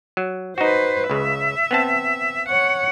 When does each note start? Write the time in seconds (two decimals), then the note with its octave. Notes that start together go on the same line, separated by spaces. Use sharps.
0.17 F#3
0.58 D#4 F#4 B4 C5
1.10 C#2 C#3 E5
1.71 B3 C4 A5
2.49 C#5 F#5